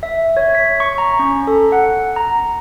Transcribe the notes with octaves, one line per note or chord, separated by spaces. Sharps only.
E5
C#5
B6
C#6
A#5
C#4
A4
F#5
A#5